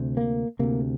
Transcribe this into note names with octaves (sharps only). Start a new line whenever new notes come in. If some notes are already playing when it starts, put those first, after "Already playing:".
Already playing: D2 C3
A#3
D2 C3 A#3